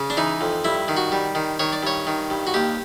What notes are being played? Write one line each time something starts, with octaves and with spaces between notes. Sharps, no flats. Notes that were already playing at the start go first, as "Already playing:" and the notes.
Already playing: C#3
D4
E3 D#4
F2
G2 E4
D#3
F#4
G3
D#3
D#3 C#5
D5
G2 C#5
D#3
G2
F#4
D#2 G4